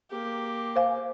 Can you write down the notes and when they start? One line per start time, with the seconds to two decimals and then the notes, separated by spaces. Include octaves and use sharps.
0.11 A#3 G4
0.76 C5 F5 G#5